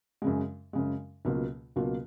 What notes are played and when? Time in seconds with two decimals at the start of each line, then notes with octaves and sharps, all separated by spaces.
0.22 F#2 C#3 G#3
0.73 F#2 C#3 G#3
1.25 C#2 B2 F#3 A#3 F4
1.76 C#2 B2 F#3 A#3 F4